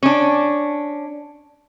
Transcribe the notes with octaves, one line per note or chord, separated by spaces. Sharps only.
C#4 D4